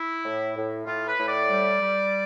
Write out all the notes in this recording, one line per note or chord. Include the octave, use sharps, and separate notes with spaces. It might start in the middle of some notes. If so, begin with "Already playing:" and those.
Already playing: E4
A2
A2
A2 F4
B4
A2
D5
G3
G3